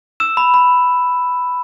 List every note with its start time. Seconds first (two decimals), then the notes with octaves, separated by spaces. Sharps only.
0.20 E6 E7
0.37 B5
0.54 B5